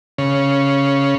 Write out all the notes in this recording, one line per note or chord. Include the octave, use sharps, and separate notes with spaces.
C#3